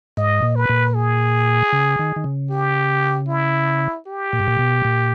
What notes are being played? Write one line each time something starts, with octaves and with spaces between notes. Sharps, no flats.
G#2 D#5
A#2
B4
A#2
G#4
C#3
D#3
D#3
C#3
G4
E4
G4
A#2
G#2
A#2
B2
A#2